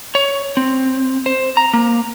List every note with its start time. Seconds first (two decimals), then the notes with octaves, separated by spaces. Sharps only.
0.15 C#5
0.57 C4
1.26 C5
1.57 A#5
1.73 A#3